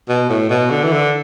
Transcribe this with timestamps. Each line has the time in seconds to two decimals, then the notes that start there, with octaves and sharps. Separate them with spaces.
0.09 B2
0.29 A2
0.50 B2
0.70 D3
0.84 E3
0.92 D3